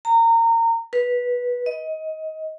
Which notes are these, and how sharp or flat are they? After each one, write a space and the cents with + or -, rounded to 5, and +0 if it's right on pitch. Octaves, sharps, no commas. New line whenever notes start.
A#5 -25
B4 -10
D#5 +20